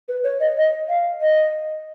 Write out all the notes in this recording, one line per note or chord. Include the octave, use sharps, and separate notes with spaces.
B4
C#5
D#5
D#5
F5
D#5